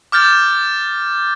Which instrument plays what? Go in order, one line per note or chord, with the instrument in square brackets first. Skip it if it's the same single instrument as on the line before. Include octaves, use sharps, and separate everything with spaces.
[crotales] D6 F6 G6 A6